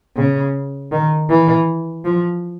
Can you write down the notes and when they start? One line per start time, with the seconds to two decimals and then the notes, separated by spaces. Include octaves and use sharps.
0.17 C#3
0.92 D#3
1.30 E3
2.05 F3